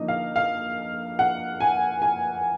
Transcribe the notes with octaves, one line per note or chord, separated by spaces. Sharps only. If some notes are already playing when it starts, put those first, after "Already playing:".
Already playing: D3 F3 A#3 D#4 D#5
F5
F5
F#5
G#5
G#5